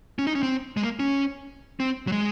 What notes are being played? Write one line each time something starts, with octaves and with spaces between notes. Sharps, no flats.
C#4
D#4
C#4
C4
G#3
A#3
C#4
C4
F#3
G#3